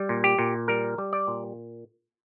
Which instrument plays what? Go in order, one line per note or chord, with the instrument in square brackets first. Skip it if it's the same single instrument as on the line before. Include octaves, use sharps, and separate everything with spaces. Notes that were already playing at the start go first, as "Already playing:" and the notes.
Already playing: [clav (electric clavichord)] G3
A#2
G4
A#2
G3 A#4
G3
D5
A#2